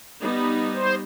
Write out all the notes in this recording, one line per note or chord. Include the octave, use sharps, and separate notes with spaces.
G3 B3 D#4
C5